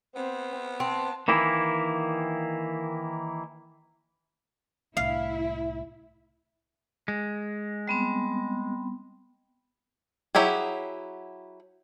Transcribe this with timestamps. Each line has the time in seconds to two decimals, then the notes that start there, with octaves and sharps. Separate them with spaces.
0.16 B3 C4
0.80 C4 A5
1.28 D#3 E3 A#3 E4
4.97 C2 A2 E4 F5
7.08 G#3
7.88 G3 B3 C4
10.35 F#3 E4 G4 G#4